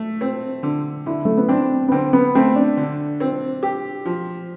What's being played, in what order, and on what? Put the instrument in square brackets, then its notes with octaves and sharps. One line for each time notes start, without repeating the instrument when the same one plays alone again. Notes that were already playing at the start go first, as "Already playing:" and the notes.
Already playing: [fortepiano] A3
C4
D3
[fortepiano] D3 [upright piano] E4
[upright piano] A3
B3
[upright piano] C4 [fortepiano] D4
[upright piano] B3
[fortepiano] D3 [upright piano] C4
[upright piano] B3
[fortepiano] A3 [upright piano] C4
[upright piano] D4
[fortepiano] D3
C4
G4
F3